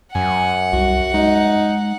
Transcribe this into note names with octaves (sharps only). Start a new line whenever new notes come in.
F#2 F#5 G#5
C2 F#4
G#3 D#4